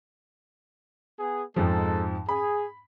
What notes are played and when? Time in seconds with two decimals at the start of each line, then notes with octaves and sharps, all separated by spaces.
1.19 B3 G#4
1.56 F2 G#2 F3 G#3 D#4 A4
2.29 G#4 B5